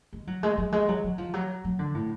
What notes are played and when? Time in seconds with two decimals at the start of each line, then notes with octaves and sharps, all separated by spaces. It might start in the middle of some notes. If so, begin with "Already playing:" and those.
0.13 G#3
0.27 F#3
0.43 G#3
0.58 F#3
0.72 G#3
0.88 F#3
1.04 F#3
1.18 F3
1.34 F#3
1.64 F#3
1.79 D3
1.94 A2